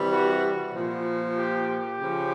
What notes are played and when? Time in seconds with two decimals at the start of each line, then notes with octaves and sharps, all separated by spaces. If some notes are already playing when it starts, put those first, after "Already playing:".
Already playing: C3 E3 G3
0.12 F#4
0.75 A#2 F3
1.38 G4
1.69 G4
2.01 C#3 F3